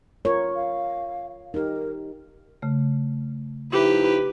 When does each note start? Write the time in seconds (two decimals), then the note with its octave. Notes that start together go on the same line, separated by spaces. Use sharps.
0.25 F4 A#4 C#5
0.55 F5
1.54 D#4 G4 A#4
2.62 C#3 A3
3.72 F3 D#4 E4 G4 B4